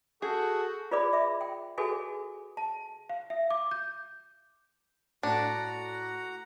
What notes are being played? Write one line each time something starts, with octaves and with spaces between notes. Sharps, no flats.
F#4 G#4 A4 D#6 G6
F4 G#4 B4 D5 B5 D6
E5 D6
G5
F#4 G#4 A4 B4 G#5
A5
F5
E5
D6
G6
A2 D4 F#4 F#5 A#5